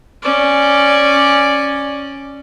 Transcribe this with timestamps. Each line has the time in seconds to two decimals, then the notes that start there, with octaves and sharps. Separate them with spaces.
0.22 C#4 D5